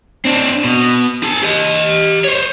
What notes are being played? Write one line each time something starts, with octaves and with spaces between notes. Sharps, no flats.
C4 D4
B2
G#4 A5
G4 D#5
C5 C#5